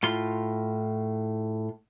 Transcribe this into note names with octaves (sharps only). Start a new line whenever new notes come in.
A2 F4 C6